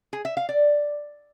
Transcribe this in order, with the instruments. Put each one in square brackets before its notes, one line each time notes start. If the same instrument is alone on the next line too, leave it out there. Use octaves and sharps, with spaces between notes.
[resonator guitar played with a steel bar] G#4
E5
F5
D5